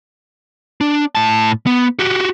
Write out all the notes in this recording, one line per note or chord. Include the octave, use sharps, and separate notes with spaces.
D4
A2 A5
B3
F#4 G4